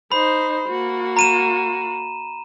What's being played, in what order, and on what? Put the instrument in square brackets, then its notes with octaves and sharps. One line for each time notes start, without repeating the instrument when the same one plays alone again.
[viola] D#4 C5 [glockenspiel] B5
[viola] A#3 F#4
[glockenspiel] A#5 D#7 E7